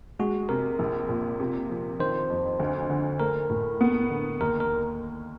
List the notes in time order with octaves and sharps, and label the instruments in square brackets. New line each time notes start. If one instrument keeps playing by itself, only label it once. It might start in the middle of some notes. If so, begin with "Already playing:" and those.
[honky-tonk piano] G#3 [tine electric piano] F#4
[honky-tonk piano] C3 [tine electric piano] A#4
[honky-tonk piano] A#1
A#2
C3
F3
[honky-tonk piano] D#3 [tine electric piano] C5
[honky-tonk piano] F2
D2
D3
[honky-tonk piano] A3 [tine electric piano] A#4
[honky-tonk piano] A2
B3
D3
[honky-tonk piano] D#2 [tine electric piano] A#4
[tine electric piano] A#4